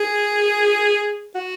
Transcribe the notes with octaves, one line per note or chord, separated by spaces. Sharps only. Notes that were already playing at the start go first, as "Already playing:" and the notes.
Already playing: G#4
F#4